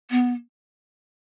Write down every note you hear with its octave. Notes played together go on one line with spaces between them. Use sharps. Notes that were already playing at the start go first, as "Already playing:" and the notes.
B3